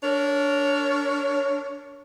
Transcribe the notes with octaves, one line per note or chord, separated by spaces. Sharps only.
D4 A#4 C#5